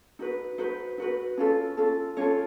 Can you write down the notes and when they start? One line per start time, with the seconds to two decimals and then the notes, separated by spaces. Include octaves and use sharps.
0.19 D#4 F#4 B4
0.58 D#4 F#4 B4 C5
0.98 D#4 F#4 B4
1.38 C#4 F4 A4
1.77 C#4 F4 A4
2.17 C#4 F4 A4 C#5